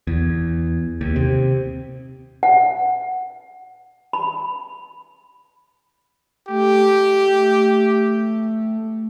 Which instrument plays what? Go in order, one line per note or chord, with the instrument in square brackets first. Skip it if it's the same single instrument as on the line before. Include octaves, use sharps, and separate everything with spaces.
[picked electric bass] E2
D#2
C3
[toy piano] F#5
B5
[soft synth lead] A3 [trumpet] G4